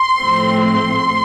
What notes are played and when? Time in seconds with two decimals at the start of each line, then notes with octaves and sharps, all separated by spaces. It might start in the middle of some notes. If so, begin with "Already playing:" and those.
Already playing: C6
0.19 A2 F3 A3 C4
0.64 C6